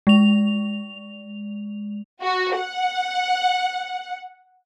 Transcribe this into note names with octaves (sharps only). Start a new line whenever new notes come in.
G#3 F7
F#4
F#5